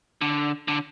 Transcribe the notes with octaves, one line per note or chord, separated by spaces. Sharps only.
D3
D3